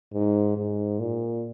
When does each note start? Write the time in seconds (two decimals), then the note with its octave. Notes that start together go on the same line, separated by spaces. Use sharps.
0.13 G#2
0.57 G#2
1.00 A#2